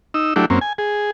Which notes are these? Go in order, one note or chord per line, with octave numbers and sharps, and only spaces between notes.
D#4 E6
F#3 A3 D4 E4 G4
F#2 A#3 C4 C#4
G#5
G#4